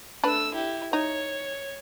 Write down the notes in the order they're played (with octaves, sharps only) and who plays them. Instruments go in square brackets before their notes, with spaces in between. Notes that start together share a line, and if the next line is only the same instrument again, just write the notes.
[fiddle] A3 E6 [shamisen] D4 B4
[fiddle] E4 G4
[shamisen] D#4 [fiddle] C#5